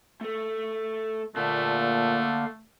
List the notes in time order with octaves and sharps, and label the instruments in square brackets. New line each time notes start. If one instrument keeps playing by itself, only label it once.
[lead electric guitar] A3 A4
[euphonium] A#2 [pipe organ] D3 F5 [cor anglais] A3 [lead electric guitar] A#3 A5